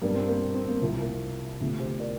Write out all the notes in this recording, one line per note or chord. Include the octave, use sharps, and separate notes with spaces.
G2 G3 A#3 D4
C4
A#3
C4
C4
A#3
C2 C3 F3 A#3
A#3
D2 C3 F3
G4 C5
A#4 D5